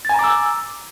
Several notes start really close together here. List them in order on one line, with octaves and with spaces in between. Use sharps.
A6 G#5 A#5 D6 E6